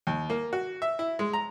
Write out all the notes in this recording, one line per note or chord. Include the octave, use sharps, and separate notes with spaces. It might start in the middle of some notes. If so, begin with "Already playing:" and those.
D#2
A#3
F#4
E5
E4
G#3
A#5